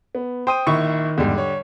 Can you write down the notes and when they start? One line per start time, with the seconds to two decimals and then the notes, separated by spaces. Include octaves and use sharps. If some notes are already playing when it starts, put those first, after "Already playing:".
0.15 B3
0.47 C5 G5 D#6 D#7
0.67 A#1 D#3 E4 C#6
1.17 E2 G#2 D3 G3
1.38 C#5